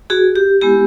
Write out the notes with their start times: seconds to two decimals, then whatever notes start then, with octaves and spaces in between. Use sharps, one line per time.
0.10 F#4 G#4
0.36 G4
0.61 G#3 B3 E4 G4